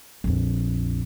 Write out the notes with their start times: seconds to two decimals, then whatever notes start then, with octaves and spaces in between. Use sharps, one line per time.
0.24 A#1 F2